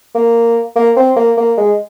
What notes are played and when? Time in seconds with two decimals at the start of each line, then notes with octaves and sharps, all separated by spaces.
0.15 A#3
0.76 A#3
0.96 C4
1.17 A#3
1.37 A#3
1.57 G#3